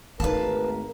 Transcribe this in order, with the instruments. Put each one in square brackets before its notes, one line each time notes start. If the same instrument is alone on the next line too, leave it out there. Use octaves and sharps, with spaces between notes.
[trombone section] G#1 A#4 [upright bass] A3 D#4 [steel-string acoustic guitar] B4 F5 A5